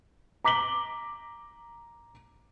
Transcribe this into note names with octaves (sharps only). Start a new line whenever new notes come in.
A#5 D6 B6 F#7 G7